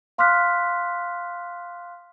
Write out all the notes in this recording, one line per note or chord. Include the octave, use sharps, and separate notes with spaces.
F5 C6 D6 F6 F#6 B6